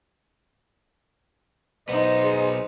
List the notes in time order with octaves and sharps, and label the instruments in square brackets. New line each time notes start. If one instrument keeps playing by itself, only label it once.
[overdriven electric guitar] B1 B3 [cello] D#4 C5
[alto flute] G#4